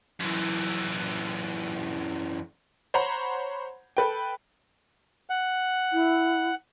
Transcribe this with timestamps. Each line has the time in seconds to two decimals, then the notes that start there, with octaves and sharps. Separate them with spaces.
0.20 F#2 E3
2.94 C5 C#5 F#5 A#5 B5
3.97 A4 B4 G5
5.30 F#5
5.93 E4